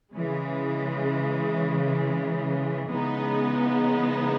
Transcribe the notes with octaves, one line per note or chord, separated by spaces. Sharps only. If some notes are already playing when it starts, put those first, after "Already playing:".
C#3 E3 G#3
C#3 E3 G#3 B3 D#4